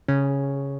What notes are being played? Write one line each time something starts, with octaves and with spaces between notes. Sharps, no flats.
C#3 C#4